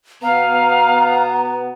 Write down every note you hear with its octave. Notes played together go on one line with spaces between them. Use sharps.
B2 B3 F5 A#5